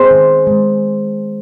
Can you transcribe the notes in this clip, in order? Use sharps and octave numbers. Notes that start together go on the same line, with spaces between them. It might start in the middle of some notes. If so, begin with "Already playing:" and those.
Already playing: B3 G#4 C5
D#3
G#3